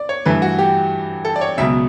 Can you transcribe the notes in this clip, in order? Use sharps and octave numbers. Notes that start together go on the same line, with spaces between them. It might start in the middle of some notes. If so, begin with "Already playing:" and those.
Already playing: D5
C#5
G2 E3 A3 B4
F#4
G4
A4
D5
C#5
C#2 B2 F#3 E5